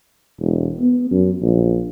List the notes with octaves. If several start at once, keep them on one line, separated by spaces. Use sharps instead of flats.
E1
B3
F#2
A#1